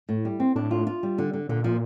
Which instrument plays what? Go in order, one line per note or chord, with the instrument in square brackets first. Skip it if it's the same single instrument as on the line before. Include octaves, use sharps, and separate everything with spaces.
[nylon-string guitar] A2
G3
C4
[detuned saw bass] A2 [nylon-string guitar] D4
[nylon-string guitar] F4
F4
G3
D3
D3
[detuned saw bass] A#2 [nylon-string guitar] D3
[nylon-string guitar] F3